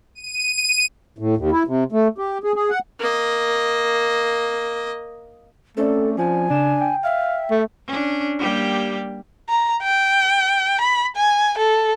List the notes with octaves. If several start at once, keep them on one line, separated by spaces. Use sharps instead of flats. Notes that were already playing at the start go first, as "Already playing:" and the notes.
D#7
A2
D#2
E4
C3
A3
G4
G#4
G#4
F#5
A#3 D#5
A3 C4 C#4 A4 D5
F3 G#5
C#3 D4 E7
G5
E5 F5
A3
C#4 D4
G3 A#3 G4
A#5
G5
B5
G#5
A4